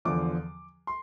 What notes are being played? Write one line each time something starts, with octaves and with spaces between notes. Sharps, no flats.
E2 D3 F3 D6
C6